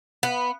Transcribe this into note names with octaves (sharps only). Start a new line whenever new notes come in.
B3